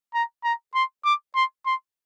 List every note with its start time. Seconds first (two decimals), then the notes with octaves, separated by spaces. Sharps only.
0.14 A#5
0.44 A#5
0.75 C6
1.05 D6
1.36 C6
1.66 C6